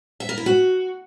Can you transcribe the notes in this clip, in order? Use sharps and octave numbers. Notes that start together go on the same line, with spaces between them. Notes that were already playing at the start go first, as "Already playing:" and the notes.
E5
A#4
E4
F#4